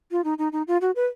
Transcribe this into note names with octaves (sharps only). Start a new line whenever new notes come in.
F4
D#4
D#4
D#4
F4
F#4
B4